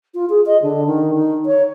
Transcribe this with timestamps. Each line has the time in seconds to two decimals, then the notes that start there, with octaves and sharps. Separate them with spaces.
0.14 F4
0.30 G#4
0.46 D#5
0.63 D3
0.86 D#3
1.14 D#4
1.46 C#5